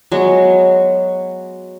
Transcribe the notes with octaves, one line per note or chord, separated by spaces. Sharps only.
F#3 G#3 B3